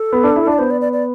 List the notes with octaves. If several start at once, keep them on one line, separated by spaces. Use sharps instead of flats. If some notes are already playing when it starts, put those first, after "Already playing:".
Already playing: A4
B3
D4
E4
D4 D5
B3 C5
D5
D5
D5